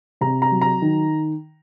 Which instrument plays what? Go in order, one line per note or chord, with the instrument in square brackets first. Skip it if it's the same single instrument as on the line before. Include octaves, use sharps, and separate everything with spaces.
[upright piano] C3 A#5
A#5
F#3
A#5
D#3